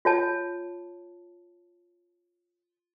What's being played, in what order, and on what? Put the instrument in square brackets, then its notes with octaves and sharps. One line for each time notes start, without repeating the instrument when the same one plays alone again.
[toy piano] F4 C#5 A5